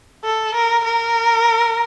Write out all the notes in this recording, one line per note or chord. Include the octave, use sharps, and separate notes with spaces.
A4
A#4
A#4